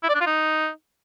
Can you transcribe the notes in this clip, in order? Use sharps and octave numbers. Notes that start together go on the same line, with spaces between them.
E4
D5
D4
F4
D#4